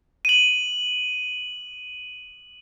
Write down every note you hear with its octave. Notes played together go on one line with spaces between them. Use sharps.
D#7 F#7